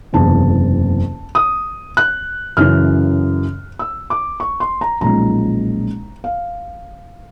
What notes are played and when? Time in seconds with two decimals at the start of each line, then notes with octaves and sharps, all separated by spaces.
0.13 F#1 E2 C3 A5
1.35 D#6
1.97 F#6
2.57 F#2 C#3 E3 F6
3.79 E6
4.10 D6
4.40 C#6
4.60 C6
4.81 A#5
5.01 B1 A#2 F3 G#3 C#4 A#5
6.24 F5